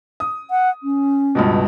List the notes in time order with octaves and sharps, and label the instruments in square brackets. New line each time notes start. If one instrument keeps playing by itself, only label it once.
[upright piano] D#6
[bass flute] F#5
C#4
[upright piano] C#2 G2 B2